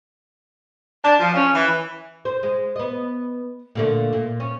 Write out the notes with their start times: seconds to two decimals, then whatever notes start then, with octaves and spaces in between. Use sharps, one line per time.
1.04 D4
1.20 F3
1.35 C#4
1.54 E3
2.25 C5
2.43 G#3
2.76 B3 D#5
3.75 A#2 D3 A3
4.13 A#2
4.40 C#4